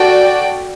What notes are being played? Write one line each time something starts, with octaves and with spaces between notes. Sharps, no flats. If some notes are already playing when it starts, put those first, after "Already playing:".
Already playing: F#4 A4 D5 G5